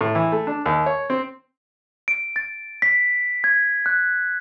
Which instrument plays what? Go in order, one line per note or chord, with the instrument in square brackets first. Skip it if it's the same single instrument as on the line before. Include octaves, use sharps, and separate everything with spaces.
[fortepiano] A2
E3
A3
D4
D#2
C#5
C4
[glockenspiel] D7
A6
B6
G#6
F#6